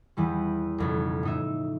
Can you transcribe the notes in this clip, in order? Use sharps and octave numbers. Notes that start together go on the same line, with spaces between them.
E2 E3 G3
B1 F2 C#3
A2 D#4 E5